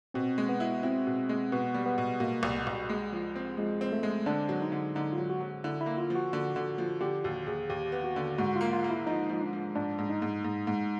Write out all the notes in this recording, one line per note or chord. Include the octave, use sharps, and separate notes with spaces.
B2 C4
G#3
B3
E4
C4 E4
B2
G#3
B2 B3
G3
B3
B2
B2 A#3
C2
C2
G#3
F3
C4
F3 G#3
C4
A3
G#3
D3 D4
F#3
D#4
D3
D3 D#4
F4
F#3
F#4
F#3
D3 E4
E4
A#3
F4
F3
F#4
D3
D3
F3
D3 G4
D#2 F#4
D#2 G#4
D#2 G4
B3
F#4
D3
G#2 F#4
F4
A#3
F4
A#3
E4
F3 D#4
F3 D#4
D4
F3
G#2 D4
G#2
D#4
G#2
G#2
G#2